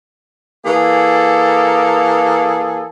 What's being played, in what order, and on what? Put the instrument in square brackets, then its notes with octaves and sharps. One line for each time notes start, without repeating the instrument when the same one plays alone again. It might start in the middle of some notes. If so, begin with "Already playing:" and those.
[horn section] E3 A#3 G#4 A4